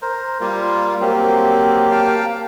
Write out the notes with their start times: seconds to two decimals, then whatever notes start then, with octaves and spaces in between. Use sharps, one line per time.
0.02 A#4 C5
0.40 G3 A#3 F4
1.00 F#3 A#3 C4 G4
1.91 F5 G5 A5